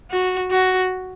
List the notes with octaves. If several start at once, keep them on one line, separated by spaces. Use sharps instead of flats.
F#4
F#4